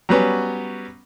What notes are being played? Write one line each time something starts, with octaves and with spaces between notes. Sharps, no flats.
F#3 G3 B3 C#4